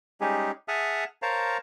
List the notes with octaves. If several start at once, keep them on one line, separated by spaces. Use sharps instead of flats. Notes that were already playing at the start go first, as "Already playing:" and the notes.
G3 G#3 C#4 D#4 G4 G#4
G#4 E5 F#5 A5 D#6 F6
A#4 C5 C#5 F5 A5 A#5